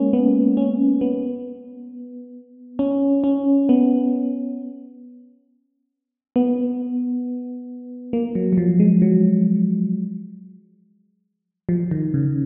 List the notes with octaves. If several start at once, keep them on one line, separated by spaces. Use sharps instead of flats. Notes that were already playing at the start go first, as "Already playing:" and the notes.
Already playing: G#3 A#3 C#4
B3
C#4
B3
C#4
C#4
B3
B3
A#3
F#3
F#3
F3
G#3
F#3
F3
D#3
C#3